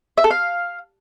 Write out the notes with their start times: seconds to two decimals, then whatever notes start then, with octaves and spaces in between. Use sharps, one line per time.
0.18 E5
0.24 A4
0.31 F5